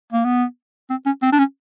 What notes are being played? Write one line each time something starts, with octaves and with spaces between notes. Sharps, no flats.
A#3
B3
C4
C#4
C4
D4
C#4